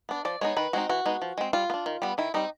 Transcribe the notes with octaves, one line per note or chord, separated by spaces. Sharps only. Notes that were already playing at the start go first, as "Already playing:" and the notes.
B3 D4
F3 D5
G#3 B3 D#4 C#5
D#3 B4
G#3 C4 D#4 F#4
E3 F#4
G#3 B3 D#4
F3
G#3 C4
G3 F4
B3
D4
D#3
G3 B3
D#3 E4
G3 C4 D#4